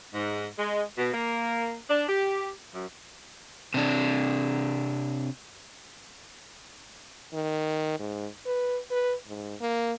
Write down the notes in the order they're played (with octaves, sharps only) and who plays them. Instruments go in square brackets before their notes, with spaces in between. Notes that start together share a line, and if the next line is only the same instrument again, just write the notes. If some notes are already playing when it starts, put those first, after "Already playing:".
[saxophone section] G#2
G#3
B2
A#3
D4
G4
F#2
[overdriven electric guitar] C3 D4
[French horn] D#3
G#2
B4
B4
G#2
A#3